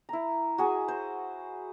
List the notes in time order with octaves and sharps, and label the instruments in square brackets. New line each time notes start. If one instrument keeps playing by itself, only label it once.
[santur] E4 A#5
F#4 G#4 G#5
C5